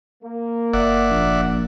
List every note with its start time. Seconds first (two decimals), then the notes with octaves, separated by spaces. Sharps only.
0.23 A#3
0.73 F#1 D5 E5 F#5
1.10 A#1